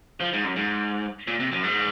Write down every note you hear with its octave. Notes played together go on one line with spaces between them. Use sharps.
F3
G#2
F#2
G#2
A#2
C3
F#2
G#2